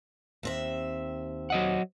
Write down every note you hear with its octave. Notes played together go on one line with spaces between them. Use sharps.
D#2 C4 E5
F#3 D#5 F#5